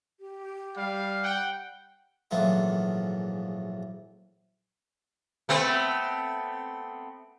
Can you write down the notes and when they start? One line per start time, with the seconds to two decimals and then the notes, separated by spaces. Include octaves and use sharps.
0.20 G4
0.77 G3 F5
1.23 F#5 G5
2.31 A#1 G#2 E3 F#3 A3 F4
5.49 A3 B3 C4